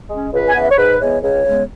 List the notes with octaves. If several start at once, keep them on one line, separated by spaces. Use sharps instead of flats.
G#3 C#4
C#2 B4
G#5
C#3 E3 B3 F#5
E5
C#5
G#2 B4
E3 G#3 B3 C#5
C#2 C#5
C#3 G#3 B3